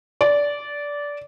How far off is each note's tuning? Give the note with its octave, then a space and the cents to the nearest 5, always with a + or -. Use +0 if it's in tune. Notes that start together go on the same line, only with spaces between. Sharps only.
D5 -15